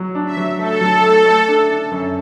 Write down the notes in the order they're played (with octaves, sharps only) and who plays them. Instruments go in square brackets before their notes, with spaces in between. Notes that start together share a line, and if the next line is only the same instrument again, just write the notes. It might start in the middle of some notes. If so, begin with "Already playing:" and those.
Already playing: [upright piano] F#3
D4
[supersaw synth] E5
[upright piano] F#3
[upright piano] A3 [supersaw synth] A4
[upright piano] F#3
A3
A3
D4
D4
F#2